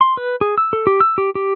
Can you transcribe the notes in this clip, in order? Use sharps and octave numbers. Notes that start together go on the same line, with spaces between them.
C6
B4
G#4
E6
A4
G4
E6
G4
G4